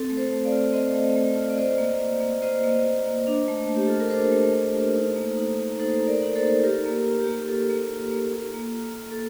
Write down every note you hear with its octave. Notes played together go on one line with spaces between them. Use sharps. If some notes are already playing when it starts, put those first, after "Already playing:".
Already playing: C4 A4
A3
A4 C5
A3
D5 F5
F4
C4 C5 D#5
A3
A3
F4
D5
F4 C5 D#5
A#3
F4
A#3
F4 C5 D#5
A#3
F4
A#3
D4
A3
A3
G4
F4 A4
A#4
D4 A4 C5
A3
A3
F4
D#4
A#3
D#4
A#3
D#4 A4 C5
A#3
A#4 D5
D#4 D5
A4 C5
A#3
F4 G4 A#4
A#3
F4
G4
A#3
F4 A4
A#3
F4
A#3
F4
A#3
F4
A#3
A4